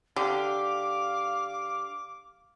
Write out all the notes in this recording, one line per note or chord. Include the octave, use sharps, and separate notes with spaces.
D3 G4 F5 D6